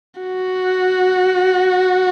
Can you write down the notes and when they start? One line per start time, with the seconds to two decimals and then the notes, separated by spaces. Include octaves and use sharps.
0.21 F#4